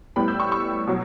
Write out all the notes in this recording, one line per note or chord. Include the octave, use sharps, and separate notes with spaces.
A2 G3 B3 G5 B5
E6 G6
C#6 E6
C#6 E6
B2 F#3